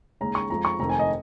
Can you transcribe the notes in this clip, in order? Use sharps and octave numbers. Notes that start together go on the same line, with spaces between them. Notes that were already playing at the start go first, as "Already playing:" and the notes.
D#2 C#3 G#3 C#4 A#5
C#6
F2 F3 G#3 A#5
C#6
F1 F2 D#3 A#5
G#5
D#5